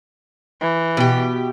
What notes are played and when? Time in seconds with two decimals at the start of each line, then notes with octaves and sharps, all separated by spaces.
0.61 E3
0.97 B2 G4